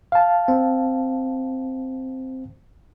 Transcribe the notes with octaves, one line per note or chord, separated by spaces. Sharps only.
F5 A5
C4